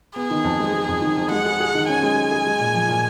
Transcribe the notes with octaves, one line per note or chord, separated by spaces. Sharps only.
B3 G#4
D#3
F2
G#3
G#3
F2
D#3
F2
G#3 F#5
G#4
G#4
D#3
C#4 G#5
G#3
G#4
G#4
G#3
A#2
F3
A#2